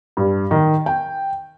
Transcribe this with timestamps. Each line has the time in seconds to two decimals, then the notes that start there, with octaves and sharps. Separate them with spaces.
0.17 G2
0.51 D#3
0.86 G5